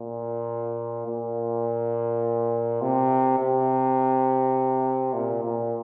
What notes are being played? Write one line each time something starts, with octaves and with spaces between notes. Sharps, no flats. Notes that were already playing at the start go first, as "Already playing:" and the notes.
Already playing: A#2
A#2
C3
C3
A#2
A#2